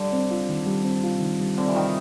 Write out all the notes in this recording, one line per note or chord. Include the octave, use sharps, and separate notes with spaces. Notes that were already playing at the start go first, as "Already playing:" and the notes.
Already playing: D3 G3
C4
F4
D#3
G3
C4
F4
D#3
G3
D3 C4
E3
D#3 F4